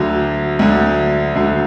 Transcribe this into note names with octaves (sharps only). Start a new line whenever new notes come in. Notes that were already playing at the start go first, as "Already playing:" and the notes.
Already playing: D2 D3 F#3
D2 D3 F#3
D2 D3 F#3